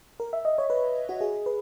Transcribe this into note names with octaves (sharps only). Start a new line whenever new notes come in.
A#4
E5
D#5
C#5
B4
F#4
G#4
B4